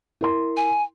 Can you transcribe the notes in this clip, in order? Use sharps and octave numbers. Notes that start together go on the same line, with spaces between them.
E4 A#4 C6
G#5